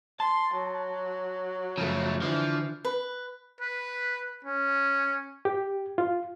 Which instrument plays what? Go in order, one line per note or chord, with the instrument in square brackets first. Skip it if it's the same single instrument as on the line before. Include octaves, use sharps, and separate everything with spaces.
[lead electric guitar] A5 [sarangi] C6
[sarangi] F#3
[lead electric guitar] F#2 F3 [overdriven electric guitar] C#3 A3
[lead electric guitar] D3 [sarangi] E3 [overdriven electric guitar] F3
[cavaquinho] B4
[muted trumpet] B4
C#4
[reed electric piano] G4
F4